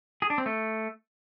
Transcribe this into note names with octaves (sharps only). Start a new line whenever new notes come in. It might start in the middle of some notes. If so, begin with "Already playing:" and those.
G#4
D4
C4
A3